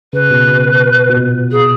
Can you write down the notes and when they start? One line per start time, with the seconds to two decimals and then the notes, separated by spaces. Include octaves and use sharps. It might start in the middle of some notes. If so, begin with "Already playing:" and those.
0.13 C#3 B4
0.31 B2
0.48 B2
1.09 B2
1.17 A#2
1.51 G#4